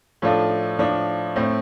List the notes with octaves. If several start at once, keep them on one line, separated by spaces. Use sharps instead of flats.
A2 F3 D4 F4 A4
A2 F3 D4
A2 A3 C4